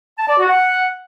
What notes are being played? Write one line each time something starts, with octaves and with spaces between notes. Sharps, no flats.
A5
D5
F#4
F#5